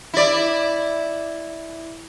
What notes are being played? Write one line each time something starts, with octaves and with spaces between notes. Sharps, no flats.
E4 D5